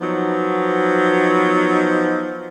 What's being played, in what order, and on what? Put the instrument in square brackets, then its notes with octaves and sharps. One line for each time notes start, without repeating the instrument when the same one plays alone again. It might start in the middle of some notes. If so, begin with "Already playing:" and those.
[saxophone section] F3 F#3 B3 D#4